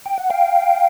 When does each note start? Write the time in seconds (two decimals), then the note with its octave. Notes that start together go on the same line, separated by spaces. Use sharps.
0.06 G5
0.18 F#5
0.30 F5 G5